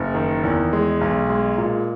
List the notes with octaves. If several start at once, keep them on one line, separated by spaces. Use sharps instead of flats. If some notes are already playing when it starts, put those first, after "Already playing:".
Already playing: F#1
D#3
E2
G#3
B1
G#3
A#2